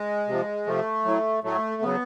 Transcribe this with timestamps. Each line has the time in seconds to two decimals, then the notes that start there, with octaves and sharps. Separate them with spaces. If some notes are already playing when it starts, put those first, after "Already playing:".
Already playing: G#3
0.28 C3 F3
0.67 C3 F3 A3
1.05 A2 F#3
1.43 A2 F#3 A3
1.82 C#3 F#3 B3